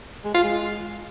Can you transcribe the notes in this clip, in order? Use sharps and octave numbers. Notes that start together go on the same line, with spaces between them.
G#3
F4
G#3